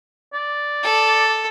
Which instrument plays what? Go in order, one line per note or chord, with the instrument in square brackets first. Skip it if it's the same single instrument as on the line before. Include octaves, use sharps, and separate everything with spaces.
[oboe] D5
[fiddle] A4